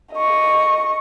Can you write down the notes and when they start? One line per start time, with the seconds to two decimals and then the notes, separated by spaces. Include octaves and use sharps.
0.13 D#5 C#6